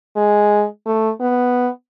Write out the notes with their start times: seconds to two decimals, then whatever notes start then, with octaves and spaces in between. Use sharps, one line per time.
0.17 G#3
0.86 A3
1.21 B3